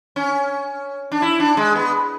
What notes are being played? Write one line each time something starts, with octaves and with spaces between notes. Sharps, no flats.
C#4
D4
E4
D4
G#3
B3